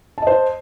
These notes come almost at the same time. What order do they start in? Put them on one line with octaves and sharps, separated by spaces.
A5 D#5 C5